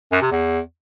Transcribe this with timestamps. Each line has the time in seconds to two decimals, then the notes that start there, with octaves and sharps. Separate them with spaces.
0.12 F#2
0.22 C3
0.32 E2